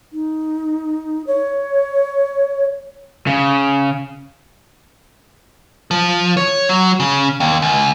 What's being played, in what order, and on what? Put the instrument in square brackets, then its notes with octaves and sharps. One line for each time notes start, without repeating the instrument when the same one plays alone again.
[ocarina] D#4
C#5
[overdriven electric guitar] C#3
[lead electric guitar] F3
C#5
F#3
C#3
D#2
C#2